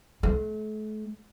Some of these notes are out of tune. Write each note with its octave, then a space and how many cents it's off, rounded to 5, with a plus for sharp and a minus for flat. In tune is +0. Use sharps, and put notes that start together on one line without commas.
A3 -40